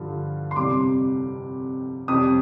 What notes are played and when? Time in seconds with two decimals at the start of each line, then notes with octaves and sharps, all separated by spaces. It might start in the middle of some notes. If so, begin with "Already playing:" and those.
Already playing: G2 D3 F3
0.51 C6
0.56 F2 C3 G3 D6
2.08 F2 C3 G3 D#6